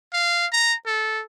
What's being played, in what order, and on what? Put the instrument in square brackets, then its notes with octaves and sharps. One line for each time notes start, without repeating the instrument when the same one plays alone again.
[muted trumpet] F5
A#5
A4